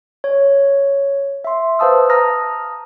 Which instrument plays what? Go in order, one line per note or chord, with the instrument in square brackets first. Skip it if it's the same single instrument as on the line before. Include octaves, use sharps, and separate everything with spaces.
[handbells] C#5
E5 C6
B4 C5 F5 A5 D#6 E6
A5 A#5 D#6 F6 A#6